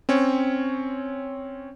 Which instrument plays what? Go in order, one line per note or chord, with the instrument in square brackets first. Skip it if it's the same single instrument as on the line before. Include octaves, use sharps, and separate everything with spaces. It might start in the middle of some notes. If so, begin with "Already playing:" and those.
[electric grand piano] C4 C#4 C#5